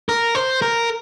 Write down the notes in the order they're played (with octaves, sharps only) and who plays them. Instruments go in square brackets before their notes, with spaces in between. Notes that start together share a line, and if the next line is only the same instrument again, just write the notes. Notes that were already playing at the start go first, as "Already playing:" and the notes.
[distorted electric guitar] A#4
C5
A#4